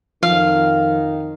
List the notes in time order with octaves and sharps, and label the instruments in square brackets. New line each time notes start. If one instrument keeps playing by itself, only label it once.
[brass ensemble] F2 D#3 [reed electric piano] F3 [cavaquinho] F5